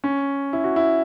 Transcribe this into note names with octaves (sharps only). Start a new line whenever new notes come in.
C#4
E4
F#4
E4